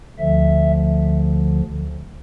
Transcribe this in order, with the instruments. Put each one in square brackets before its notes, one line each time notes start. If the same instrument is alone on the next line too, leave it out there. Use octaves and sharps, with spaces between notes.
[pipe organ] D2 D3 F3 E5